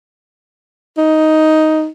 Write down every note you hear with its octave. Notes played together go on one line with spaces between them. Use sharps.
D#4